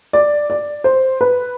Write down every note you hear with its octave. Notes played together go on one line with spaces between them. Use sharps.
D5
D5
C5
B4